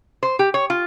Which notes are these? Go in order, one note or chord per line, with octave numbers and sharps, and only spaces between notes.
C5
G4
C#5
F4